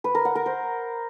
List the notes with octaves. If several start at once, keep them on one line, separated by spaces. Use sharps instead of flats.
B4
A#4
F#5
A#4
C5